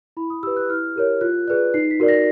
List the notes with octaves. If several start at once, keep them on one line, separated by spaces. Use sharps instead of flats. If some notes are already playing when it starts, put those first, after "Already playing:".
E4 B5
D#6
G4 B4 E6
F#6
E4 F6
G4 A#4 C#5
F4 F#6
G#4 B4 D5 F#6
D#4 C7
B6
F#4 A#4 D5
A#6